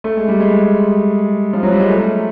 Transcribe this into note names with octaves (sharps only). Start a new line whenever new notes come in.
A3
G#3
G3
G#3
F3
F#3
G3
G#3
A3